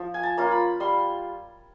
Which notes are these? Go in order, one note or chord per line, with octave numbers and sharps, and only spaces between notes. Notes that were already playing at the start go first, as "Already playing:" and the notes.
Already playing: F3
G#5
A5
A#3 C#4 F4
B5
G3 C6